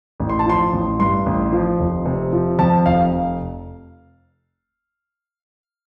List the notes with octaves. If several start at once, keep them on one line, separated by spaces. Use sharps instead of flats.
A1
C6
A5
F3 C6
A1
G2 C6
A1
F3
F1
C3
F3
F2 A5
F1 F5